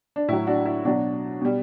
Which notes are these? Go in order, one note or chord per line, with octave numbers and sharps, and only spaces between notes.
D4
A2 F#3 E4
D4 F#4
E4
B2 F#3 D4 F#4
B2 G3